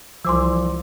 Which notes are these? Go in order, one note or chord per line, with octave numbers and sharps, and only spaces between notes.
C2 E3 F3 C5 G#5 C6 D6 E6